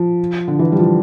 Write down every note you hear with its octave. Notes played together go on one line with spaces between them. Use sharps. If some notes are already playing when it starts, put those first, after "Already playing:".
Already playing: F3
D3
E3
G3
F3